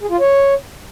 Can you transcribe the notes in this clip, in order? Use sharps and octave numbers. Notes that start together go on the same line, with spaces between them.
G#4
F4
C#5